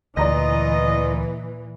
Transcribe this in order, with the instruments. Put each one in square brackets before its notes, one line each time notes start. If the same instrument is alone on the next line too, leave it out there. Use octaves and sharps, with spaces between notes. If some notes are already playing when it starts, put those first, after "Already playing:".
[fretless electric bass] D2 [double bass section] A#2 E3 [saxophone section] F4 D#5 [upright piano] D5 A#5 A#6